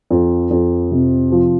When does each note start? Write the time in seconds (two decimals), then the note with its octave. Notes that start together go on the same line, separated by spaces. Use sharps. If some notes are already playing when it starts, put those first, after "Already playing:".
0.10 F2
0.51 F2
0.91 C3
1.32 F3